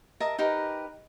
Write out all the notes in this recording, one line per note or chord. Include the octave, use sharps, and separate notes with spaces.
A#4 D#5 E5 A5
D#4 G4 A#4 B4